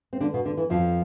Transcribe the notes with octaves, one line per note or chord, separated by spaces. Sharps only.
C4
D3 D4
B2 B3
D3
E3
F2 F3